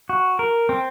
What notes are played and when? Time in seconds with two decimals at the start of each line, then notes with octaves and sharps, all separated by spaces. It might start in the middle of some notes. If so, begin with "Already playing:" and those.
0.09 F#4
0.39 A#4
0.69 C4